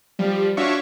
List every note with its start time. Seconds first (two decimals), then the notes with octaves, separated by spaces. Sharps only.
0.19 F3 G3
0.57 D4 F4 F#4 C#5 E5 C#6